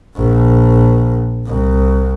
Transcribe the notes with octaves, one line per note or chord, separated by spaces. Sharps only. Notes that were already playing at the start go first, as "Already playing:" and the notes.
A#1
C2